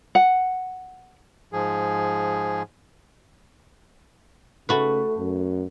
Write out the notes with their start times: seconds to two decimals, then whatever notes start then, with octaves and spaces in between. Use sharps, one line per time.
0.15 F#5
1.53 G#2 F3 G#4
4.69 C#3 A3 F#4 B4
5.18 F#2